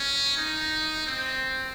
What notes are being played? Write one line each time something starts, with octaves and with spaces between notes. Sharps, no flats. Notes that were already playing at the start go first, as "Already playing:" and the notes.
Already playing: C#4
D#4
C4